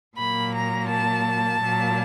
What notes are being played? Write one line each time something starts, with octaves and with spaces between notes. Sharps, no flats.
A#2 F#3 A#3 B5
A#5
A5
A#2 F#3 A#3